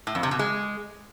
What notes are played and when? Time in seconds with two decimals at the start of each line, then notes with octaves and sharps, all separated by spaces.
0.07 A2
0.15 F2
0.23 C3
0.31 B2
0.39 G#3